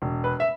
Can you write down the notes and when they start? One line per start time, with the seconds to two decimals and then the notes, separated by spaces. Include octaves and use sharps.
0.02 E1
0.24 B4
0.40 E5